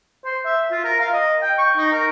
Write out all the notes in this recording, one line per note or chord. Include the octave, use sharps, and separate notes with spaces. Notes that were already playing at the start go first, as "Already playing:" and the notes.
C5
E5
F4
A#4
F5
D#5
G5
C#6
D#4
A#4